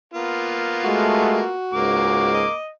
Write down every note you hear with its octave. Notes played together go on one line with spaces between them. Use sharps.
A#3 B3 F4
G#3 A3 F#4
C#2 G#2 A#3 D6
D#5